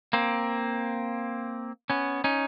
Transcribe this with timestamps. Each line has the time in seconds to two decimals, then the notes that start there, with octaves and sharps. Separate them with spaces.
0.13 A#3 C4
1.90 B3 C#4
2.24 C#4 D#4